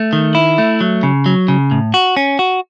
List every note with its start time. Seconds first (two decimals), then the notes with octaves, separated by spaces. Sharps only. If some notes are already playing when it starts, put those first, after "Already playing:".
Already playing: A3
0.13 D#3
0.35 E4
0.58 A3
0.81 F#3
1.03 C#3
1.26 F#3
1.48 C#3
1.71 A2
1.94 F#4
2.17 C#4
2.39 F#4